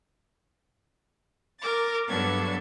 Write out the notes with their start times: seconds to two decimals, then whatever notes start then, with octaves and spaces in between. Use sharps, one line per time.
1.60 A#4 D6 A6
2.06 G2 F#3 B3 D4 A4 G#6